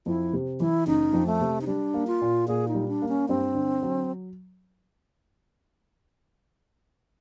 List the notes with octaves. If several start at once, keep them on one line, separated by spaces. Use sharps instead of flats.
F2 E4
C3
E3 E4
F#1 D#4
F2
A3
C3
D#4
G3 D4
A#3
F4
A#2
A#2 G#4
D#4
G3
D4
A#3
C#4
G2 C4
D3
F#3